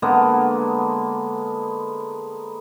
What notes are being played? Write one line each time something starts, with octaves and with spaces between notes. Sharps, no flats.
D3 G#3 A#3 B3